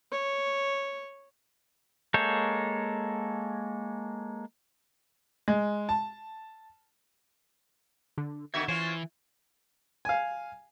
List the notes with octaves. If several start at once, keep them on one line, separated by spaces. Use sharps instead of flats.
C#5
G#3 A#3 A4 C#5 G6
G#3
A5
D3
D3 D#3 B3 C4 F#4 E5 G#6
E3 C#4 F4 C5 C#5
F5 G#5